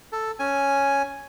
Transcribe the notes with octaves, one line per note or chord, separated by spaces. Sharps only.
A4
C#4 G#5